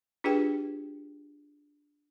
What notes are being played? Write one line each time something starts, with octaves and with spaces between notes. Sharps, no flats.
D4 F4 G4 G#4 B4 G5